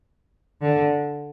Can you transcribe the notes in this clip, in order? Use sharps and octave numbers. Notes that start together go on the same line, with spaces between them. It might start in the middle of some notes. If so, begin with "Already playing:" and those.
D3